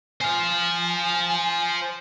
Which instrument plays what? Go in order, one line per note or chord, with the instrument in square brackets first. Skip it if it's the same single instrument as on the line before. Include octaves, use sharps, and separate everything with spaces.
[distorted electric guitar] C5 F5 [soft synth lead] G#5